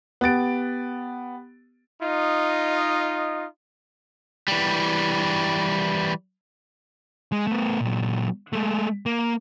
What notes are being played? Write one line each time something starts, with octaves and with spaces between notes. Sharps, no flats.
B3 G4 A6 D7
D#4 F4 D#5
E3 G3
G#3
A3 B3
A#2 F#3
G#3 A3
A#3